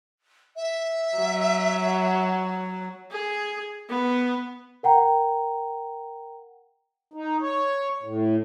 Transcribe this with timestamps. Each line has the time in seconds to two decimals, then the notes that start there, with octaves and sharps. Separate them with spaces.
0.57 E5
1.18 F#3
3.11 G#4
3.89 B3
4.83 A#4 F#5 G5 A#5
7.14 D#4
7.41 C#5
8.03 A2